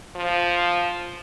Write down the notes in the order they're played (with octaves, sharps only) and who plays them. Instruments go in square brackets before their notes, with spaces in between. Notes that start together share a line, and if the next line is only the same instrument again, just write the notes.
[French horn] F3